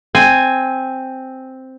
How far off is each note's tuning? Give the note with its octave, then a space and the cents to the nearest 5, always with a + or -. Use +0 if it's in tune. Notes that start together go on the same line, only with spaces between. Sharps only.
C4 +0 G#5 +0